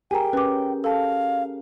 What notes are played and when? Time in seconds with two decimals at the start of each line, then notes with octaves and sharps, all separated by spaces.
0.11 G4 G#4 A#4 G5 G#5 A#5
0.33 C#4 B4 D6
0.84 A4 F5 A5